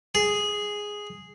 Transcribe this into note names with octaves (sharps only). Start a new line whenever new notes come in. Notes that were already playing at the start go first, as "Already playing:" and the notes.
G#4